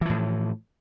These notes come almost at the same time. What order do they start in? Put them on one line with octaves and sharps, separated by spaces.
E3 F3 A2